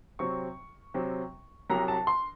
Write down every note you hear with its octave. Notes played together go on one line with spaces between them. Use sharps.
C3 F#3 C4 C#6
C3 F#3 C4
C2 C3 F#3 A#5
A5
C6